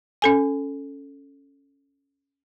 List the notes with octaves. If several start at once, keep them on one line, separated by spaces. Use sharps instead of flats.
C#4 A4 G#5